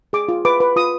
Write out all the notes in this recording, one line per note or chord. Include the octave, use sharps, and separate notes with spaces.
G#4 D6
F4
B4 D6
B4
F4 D#6